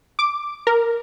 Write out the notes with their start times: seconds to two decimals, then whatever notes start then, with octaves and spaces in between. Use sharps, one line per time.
0.19 D6
0.67 A#4